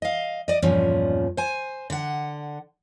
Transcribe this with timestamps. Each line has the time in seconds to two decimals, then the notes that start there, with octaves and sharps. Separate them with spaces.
0.02 D#5 F5
0.48 D5 D#5
0.62 E2 G2 A#2 F3 C#4
1.37 C5 G#5
1.90 D3 F#5